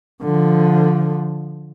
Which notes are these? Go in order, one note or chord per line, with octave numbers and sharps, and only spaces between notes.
D3 F3